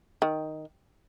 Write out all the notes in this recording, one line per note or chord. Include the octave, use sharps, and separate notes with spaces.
D#3